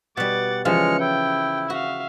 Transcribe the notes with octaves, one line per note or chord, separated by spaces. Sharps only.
B2 G3 F#5 D6 A6
C#3 E3 F3 G#3 F4 F6 C#7
E4 G5
F#4 E5 F5